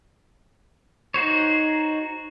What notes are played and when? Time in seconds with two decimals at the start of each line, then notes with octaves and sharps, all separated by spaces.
1.14 D#4 F#4 C5 C#5